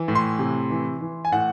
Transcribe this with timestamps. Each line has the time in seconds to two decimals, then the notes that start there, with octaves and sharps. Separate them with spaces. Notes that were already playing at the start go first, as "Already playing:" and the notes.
Already playing: E3
0.08 A2
0.15 C6
0.39 C3
0.70 E3
1.01 E3
1.25 G#5
1.32 A2 F#5